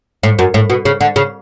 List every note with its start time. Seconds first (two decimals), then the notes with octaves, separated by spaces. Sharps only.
0.23 A2
0.39 F#2
0.54 A2
0.70 B2
0.85 C#3
1.01 D3
1.16 C#3